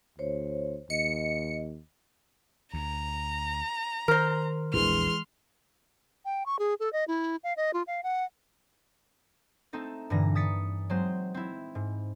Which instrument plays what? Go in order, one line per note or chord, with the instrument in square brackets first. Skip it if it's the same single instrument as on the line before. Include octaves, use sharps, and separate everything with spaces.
[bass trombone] D2 [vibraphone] C5 C#5
[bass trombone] D#2 [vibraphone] D#5 [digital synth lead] C#7
[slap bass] D2 [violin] A#5
[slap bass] D#3 [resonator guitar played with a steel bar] A#4 C5
[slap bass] A#1 E2 D4 [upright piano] E3 G#3 [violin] C6 F6
[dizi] G5
C#6
G#4
A4
D#5
E4
F5
D#5
F4
F5
F#5
[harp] A3 C4 D#4 A4
G2 A#2 D3 E3 A#6
D#6 A6 B6 C#7
F#3 G#3 C4 C5
C4 E4
G#2